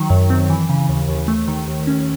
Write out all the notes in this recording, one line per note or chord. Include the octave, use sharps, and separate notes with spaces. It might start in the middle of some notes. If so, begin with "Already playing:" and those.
Already playing: D#3 F#3
F#2
C4
E3
C#3
D#2
D#2
A3
D#3
D#2
C#4